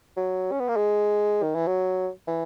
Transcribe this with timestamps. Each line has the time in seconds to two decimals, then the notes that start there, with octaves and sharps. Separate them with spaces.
0.17 F#3
0.52 C#4
0.60 B3
0.69 A#3
0.77 G#3
1.43 D#3
1.55 E3
1.67 F#3
2.27 E3